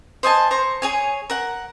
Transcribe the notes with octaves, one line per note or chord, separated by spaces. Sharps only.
C5 D#5 G#5 A5
C5 A#5 C#6
G#4 C#5 G#5
A#4 F#5